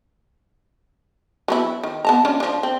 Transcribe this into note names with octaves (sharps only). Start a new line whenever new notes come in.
F#3 B3 E4
D#3
B3 A5 A#5
F3 C#4 D4
F3 D4
C4